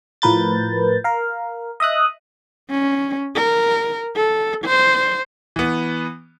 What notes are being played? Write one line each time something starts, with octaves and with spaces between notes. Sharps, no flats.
A2 F3 A#4 B4 G6 A6
A#4 F5
D#5 E5 D#6 F#6
C#4
A#4
A4
C5
E3 B3